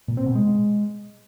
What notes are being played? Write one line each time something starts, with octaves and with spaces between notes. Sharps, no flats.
A#2
C4
B2
G#3